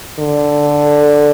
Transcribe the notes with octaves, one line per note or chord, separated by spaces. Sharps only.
D3